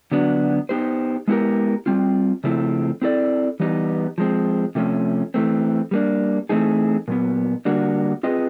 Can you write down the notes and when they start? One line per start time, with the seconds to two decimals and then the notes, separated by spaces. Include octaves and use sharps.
0.12 D3 F#3 B3 D4 F#4
0.69 B3 D#4 G4 C5
1.28 G#3 B3 E4 G4 A#4
1.86 G3 C4 F4
2.44 C#3 F3 A3 C4 E4
3.02 C4 E4 A4 D5
3.60 E3 G3 B3 D#4 G4
4.18 F3 G#3 C4
4.75 C3 F3 A3 C#4
5.34 E3 A3 C4
5.91 G3 A#3 D4
6.49 E3 A3 C4 D#4 G#4
7.08 A#2 F#3 B3
7.65 D3 G3 A#3 D4 F#4
8.23 C4 F4 G#4 B4 D#5